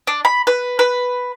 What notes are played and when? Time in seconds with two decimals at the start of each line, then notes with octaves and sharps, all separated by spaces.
0.07 D4
0.25 B5
0.47 B4
0.79 B4